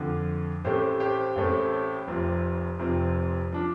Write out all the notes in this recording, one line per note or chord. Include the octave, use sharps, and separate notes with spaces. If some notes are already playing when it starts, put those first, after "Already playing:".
Already playing: F2 D3 F3
A1 A2 A3 C4 G4 C5
G4 C5
A1 A2 A3 C4
F1 F2 C3 F3 C4
F1 F2 C3 F3 C4
F3 D4